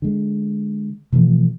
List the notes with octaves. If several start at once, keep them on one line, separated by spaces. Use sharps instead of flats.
D3 G#3
B2 E3 F3 A3